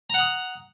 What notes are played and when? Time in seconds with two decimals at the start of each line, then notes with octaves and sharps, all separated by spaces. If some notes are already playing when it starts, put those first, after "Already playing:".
0.10 A#5
0.14 F#5
0.19 D#6